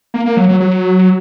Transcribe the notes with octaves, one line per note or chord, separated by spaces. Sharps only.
A#3
A#3
F#3
F#3
F#3